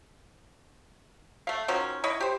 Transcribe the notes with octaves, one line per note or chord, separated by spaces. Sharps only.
A3 F5
D#3 F3 F#3 C#4
E4 C#5 D#5
G4 C5